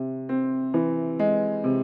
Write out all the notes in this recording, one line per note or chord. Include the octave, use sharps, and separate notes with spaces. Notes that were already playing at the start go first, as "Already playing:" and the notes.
Already playing: C3
C4
E3
G#3
C3